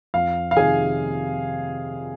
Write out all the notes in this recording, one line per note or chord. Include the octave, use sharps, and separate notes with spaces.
F2 F5
F5
C3 D#3 G#4 G#5